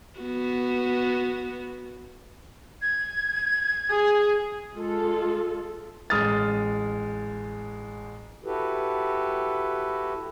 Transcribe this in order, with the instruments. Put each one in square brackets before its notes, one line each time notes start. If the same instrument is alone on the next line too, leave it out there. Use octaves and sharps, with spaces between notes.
[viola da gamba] B3 F#4
[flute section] G#6
[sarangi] G#4
[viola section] G#3 F4 A4
[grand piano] A1 G#3 D#6 F6 A6
[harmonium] E4 F#4 G4 A4 B4